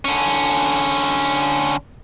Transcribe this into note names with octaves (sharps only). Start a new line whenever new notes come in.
D3 C#4